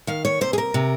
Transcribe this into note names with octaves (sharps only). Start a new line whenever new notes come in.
D#3 F5
C#5
C3 C5
G#4
A#4
C3